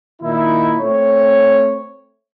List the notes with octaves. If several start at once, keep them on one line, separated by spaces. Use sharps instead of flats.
A#2 D#3 D#4 E4
A3 C4 C#5